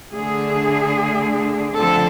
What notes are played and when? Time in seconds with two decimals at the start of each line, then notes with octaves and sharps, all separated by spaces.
0.14 D3 A3 D4 G#4
1.77 D3 F3 A3 C4 A4